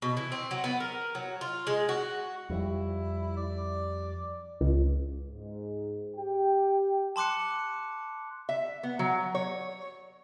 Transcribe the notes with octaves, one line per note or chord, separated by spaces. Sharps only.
B2
E3
C4
F#3
B3
A#4
F#3
F4
G#3
F#4
F2 G3 E4
D5
C#2
G#2
G4 G5
A5 C6 D6 F#6 C#7
E5
B3
F#3
C#5